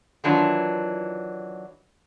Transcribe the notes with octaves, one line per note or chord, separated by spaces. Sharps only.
D#3 E3 F#3 D4 F4